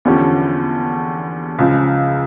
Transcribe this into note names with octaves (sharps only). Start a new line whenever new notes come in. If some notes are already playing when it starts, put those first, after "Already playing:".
E2 D3 F3 C#4 G4
C#2 C#3 F3